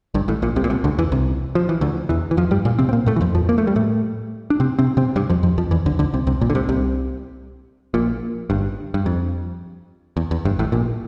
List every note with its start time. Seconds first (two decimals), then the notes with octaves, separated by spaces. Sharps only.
0.14 G1 G2
0.28 A1 A2
0.42 A#1 A#2
0.56 C2 C3
0.64 A#2
0.70 C2 C3
0.84 D2 D3
0.98 E2 E3
1.12 C2 C3
1.55 F3
1.69 E3
1.81 D2 D3
2.09 E2 E3
2.31 E3
2.37 F2 F3
2.51 G2 G3
2.65 A#2 A#3
2.79 C3 C4
2.89 C4
2.93 A#2 A#3
3.06 A2 A3
3.16 E3
3.21 F2 F3
3.35 F2 F3
3.49 A#3
3.58 A3
3.67 G3
3.76 A2 A3
4.50 D4
4.60 C3 C4
4.79 C3 C4
4.97 C3 C4
5.16 G2 G3
5.30 F2 F3
5.43 F2 F3
5.58 F2 F3
5.71 E2 E3
5.86 D2 D3
5.99 D2 D3
6.13 C2 C3
6.27 C2 C3
6.41 A#1 A#2
6.50 D3
6.55 C2 C3
6.69 C2 C3
7.94 A#1 A#2
8.50 G1 G2
8.94 G2
9.06 F2
10.17 E2
10.31 E2
10.45 G1 G2
10.59 A1 A2
10.72 A#1 A#2